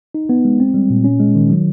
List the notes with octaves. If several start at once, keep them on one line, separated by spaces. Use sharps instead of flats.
D#4
B3
G#3
C4
G3
A#2
C#4
G#3
D#3
F#3